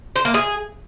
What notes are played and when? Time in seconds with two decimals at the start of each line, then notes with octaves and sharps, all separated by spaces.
0.16 C5
0.25 A#3
0.34 G#4